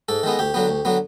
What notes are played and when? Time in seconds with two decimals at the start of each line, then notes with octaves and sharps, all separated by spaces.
0.09 G#2 A4
0.23 D#3 G#3 B3
0.39 D2 G4
0.54 D3 F#3 B3
0.69 D2
0.85 D3 F#3 B3